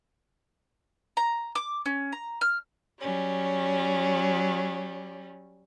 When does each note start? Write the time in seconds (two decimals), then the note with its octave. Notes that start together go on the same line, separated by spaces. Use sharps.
1.17 A#5
1.55 D6
1.86 C#4
2.13 A#5
2.41 F6
2.99 F#3 G3 C#4